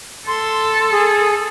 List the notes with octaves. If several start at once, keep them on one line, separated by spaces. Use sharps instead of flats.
A4 C6
G#4